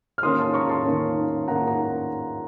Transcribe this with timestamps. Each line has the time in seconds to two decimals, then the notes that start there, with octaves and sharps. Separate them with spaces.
0.18 F6
0.23 D#3 A#3 C#4 C6 D#6
0.39 A5 C6
0.54 A#5 C#6
0.69 A5 C6
0.85 D#3 A#3 C#4
1.48 D#3 A#3 C#4 F#5 A#5
1.67 A#5